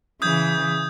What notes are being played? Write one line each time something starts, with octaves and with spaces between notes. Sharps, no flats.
C#3 E3 D#6 G6 G#6